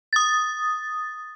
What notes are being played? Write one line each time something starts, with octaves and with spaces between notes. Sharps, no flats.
D#6 A6